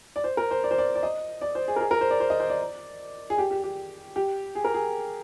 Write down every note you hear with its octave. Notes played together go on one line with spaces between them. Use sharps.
D5
C5
A#4
C5
D5
C5
D5
D5
D#5
D5
C5
G#4
A#4
G#4
A#4
C5
D5
C5
D#5
C5
D5
G#4
G4
G4
G4
G4
G#4
A#4
G#4